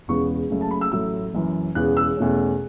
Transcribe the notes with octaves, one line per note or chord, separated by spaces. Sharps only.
E1 E2 C#3 E3 B3 C#6
F#1 F#2 C#3 A3
A5
B5
E6
A1 A2 F#3 A3 E6
F#1 F#2 E3
E1 E2 C#3 E3 B3 F#6
E6
E2 B2 A3 C#4